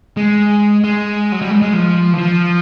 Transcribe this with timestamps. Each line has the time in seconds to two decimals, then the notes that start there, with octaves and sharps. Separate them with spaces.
0.17 G#3
0.84 G#3
1.32 F#3
1.42 G3
1.51 G#3
1.62 G#3
1.73 F3
2.13 E3
2.18 F3